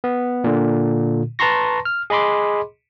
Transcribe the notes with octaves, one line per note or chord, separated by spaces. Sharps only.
B3
A#2 D3
B4 A5 A#5 C6 C#6 A#6
F6
G#4 D#5 B5 C6 D6